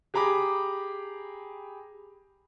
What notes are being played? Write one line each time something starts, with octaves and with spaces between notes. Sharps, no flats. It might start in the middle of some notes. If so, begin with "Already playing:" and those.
G4 G#4 A#5 B5 D6